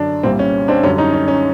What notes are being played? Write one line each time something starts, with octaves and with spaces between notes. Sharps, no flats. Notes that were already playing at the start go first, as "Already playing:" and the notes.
Already playing: F#2 D3 D4
C2 A#2 G3 C4
C#4
C4 D4
F#2 D3 G3 C#4
C#4 D#4
C#4
C#4